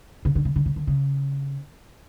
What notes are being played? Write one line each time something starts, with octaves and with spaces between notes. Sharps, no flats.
C#3
D3
C#3
D3
C#3
D3
C#3